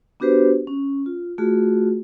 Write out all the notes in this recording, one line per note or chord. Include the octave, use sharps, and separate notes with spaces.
B3 D4 F#4 G4 B4 C5
C#4
F4
A3 F4 F#4 G#4